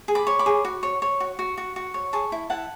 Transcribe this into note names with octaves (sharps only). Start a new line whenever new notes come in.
G#4
B5 D6
C#5
B5 D6
G#4
F#4
C#5
C#5
F#4
F#4
F#4
F#4
C#5
G#4 A5 C#6
E4
E4 F#5 A5